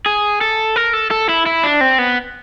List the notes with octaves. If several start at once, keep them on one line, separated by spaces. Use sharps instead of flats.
G#4
A4
A#4
A4
A4
E4
E4
D4
C4
B3